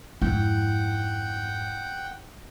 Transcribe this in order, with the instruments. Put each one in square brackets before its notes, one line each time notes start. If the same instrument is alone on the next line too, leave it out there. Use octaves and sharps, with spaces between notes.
[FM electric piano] F2 G#2 [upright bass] E4 [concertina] F#5 G5